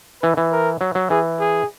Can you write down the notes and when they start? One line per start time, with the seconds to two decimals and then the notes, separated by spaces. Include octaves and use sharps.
0.22 E3 B4
0.37 E3
0.52 A#4
0.81 F#3
0.95 F#3
1.10 E3 G#4
1.40 G#4